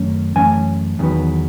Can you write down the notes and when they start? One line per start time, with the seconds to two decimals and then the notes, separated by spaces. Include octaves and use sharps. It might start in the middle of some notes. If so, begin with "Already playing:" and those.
Already playing: F#2 D#3 A3 C#4
0.36 F#2 E3 A3 C#4 G#5
0.99 E2 D#3 F#3 B3